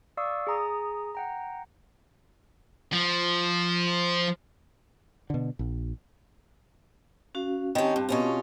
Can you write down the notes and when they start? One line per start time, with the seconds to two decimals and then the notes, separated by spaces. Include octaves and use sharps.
0.17 D5 F5 C#6 D#6 E6
0.47 G#4 A#5 D#6
1.15 F#5 G5 A#5
2.93 F3
5.30 B2 D3
5.59 A#1
7.35 C#4 F#4 F5
7.75 D#3 C4 C#4 G4 A5
7.96 G2
8.09 B2 C#4 F4